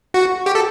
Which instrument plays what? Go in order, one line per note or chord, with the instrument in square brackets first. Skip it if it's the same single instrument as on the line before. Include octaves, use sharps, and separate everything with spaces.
[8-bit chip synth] F#4
G4
A4